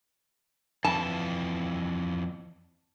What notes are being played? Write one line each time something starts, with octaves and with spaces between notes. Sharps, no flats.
F2 E3 A5